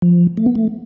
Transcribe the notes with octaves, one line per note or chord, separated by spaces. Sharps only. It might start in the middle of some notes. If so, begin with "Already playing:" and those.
F3
A3
B3
A3